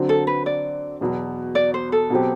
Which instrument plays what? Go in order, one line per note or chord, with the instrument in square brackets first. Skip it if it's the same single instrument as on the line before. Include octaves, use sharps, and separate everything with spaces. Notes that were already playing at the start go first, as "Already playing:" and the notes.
Already playing: [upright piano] D3 F#3 C4
[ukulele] A4
B4
D5
[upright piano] E2 B2 F#3
[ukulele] D5
C5
A4
[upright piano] B2 F#3 C4 G4